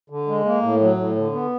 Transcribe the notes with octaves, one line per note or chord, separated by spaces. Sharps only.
D3
G#3
A#3
A2
F#3
A2
D3
B3